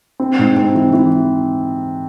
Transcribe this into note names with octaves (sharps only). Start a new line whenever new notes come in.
C4
G#2
C4
E3
E3